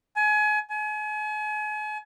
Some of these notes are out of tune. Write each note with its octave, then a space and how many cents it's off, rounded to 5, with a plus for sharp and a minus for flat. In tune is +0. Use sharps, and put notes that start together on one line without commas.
G#5 +30
G#5 +35